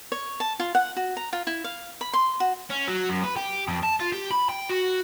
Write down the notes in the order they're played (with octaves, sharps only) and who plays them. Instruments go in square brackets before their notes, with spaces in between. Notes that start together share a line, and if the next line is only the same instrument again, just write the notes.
[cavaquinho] C#5
A5
F4
F#5
F#4
A#5
F4
E4
F5
B5
C6
F#4
[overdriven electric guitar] C#4
F#3
F#2
B4
G4
F2
A5
F4
G4
B5
G5
F#4